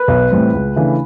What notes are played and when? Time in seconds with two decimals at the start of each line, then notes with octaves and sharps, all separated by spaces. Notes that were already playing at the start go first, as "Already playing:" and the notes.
Already playing: B4
0.08 B1
0.31 A2 E3 G3 C4
0.53 C#2
0.76 C#3 E3 A3 D4